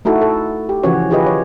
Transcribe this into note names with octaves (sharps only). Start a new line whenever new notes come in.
A3 D#4 E4 F#4 A4
A4
G4
C#3 E3 F3 C#4 F#4 C#5
D#3 F4 G4 G#4 B4 D#5
C#5